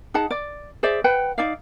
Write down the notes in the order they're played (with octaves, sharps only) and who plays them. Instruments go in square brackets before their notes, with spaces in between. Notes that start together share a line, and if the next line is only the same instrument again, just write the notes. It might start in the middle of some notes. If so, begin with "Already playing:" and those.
[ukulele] D#4 G#4 F#5 A5
D5
G#4 C5 D5 E5
B4 F#5 G5
D#4 D5 F5